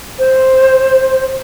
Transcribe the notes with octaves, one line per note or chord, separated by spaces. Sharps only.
C5